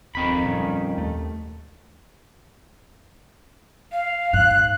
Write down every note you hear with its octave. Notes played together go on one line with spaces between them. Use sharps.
D1 F2 D#3 C4 B5
A#2 G3 C#4
D#2 A3
F5
G#2 F#6